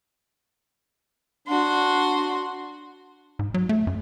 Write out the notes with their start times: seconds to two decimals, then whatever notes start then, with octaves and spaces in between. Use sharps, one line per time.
1.48 D4 F#4 C6
3.39 G#2
3.54 F#3
3.69 A3
3.87 F#2